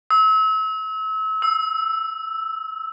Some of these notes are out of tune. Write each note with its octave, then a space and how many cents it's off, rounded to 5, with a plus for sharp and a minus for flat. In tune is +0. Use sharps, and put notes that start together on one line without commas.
E6 -35
E6 +0